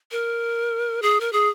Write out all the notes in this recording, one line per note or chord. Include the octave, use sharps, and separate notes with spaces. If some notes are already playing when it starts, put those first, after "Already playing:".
A#4
G#4
A#4
G#4